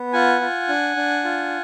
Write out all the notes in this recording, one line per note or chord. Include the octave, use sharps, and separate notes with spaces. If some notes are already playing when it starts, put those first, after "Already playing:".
Already playing: B3
F4 F#5 G#5
F4
D4
D4
F4